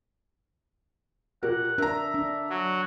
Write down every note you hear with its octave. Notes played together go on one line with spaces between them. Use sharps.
A#2 G4 A#4 F#5
D4 A#4 E5 A#5
D4
F#3